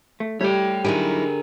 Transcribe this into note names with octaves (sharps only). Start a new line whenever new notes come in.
A3
G3 A3 G4 C#5 G5
D3 F#3 D#4 E4 G4 G#4 A#4 G#5